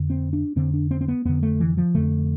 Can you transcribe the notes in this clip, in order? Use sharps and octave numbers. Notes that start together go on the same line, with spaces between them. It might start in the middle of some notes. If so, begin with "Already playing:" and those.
Already playing: F2 D3
C4
D4
F2 D3 C4
D4
C4
C4
B3
F2 D3 B3
A3
E3
F3
F2 D3 A3